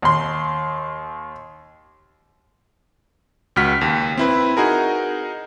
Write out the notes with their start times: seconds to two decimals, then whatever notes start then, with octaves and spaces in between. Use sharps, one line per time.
0.02 D#2 C6
3.56 C#2 F#4 F6 B6
3.81 D#2
4.17 C4 E4 B4
4.57 D#4 F#4 G#4 A#4